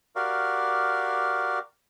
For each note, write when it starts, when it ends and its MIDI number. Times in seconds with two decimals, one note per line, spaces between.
0.16 1.59 66
0.16 1.59 67
0.16 1.59 70
0.16 1.59 74
0.16 1.59 77